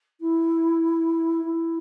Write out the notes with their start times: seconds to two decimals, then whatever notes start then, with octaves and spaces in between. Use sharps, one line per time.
0.21 E4
1.44 E4